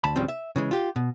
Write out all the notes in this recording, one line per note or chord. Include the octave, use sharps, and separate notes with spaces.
D2 A5 B5
D2 A2 C#3 F3 G3 C4
E5
C#3 E3 G#3
F4 G4
B2